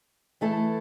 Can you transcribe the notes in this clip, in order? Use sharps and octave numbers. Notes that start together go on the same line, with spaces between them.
E3 A3 E4 A4